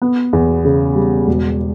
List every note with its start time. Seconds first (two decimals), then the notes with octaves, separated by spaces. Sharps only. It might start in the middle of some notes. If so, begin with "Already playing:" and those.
0.02 B3
0.33 E2
0.65 C#3
0.96 G3
1.27 E1